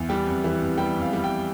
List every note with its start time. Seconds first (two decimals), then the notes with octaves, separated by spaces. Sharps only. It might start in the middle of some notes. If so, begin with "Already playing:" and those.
Already playing: E2
0.09 G3 G5
0.26 F2
0.44 E3
0.61 F2
0.78 G3 G5
0.96 F2
1.01 F5
1.13 G3
1.24 G5